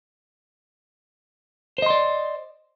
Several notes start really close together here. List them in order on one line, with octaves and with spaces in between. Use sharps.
C5 D#5 C6 D5